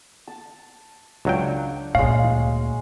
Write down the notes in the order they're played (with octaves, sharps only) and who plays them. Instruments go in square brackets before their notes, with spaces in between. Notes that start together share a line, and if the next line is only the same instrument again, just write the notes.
[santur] A5
[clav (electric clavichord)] C#2 F#3 G5 [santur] D4 F5 C#6
[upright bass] D2 A#2 [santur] G#3 C#4 [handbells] F5